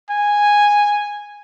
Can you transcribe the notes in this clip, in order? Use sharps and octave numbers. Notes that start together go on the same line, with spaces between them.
G#5